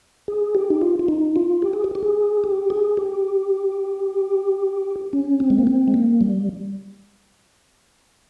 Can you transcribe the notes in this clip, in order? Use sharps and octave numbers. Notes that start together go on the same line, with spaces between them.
G#4
G4
D#4
F4
F4
D#4
F4
G4
G#4
G4
G4
G#4
G4
G#4
G4
C#4
C4
G#3
A#3
C4
G#3
A#3
G3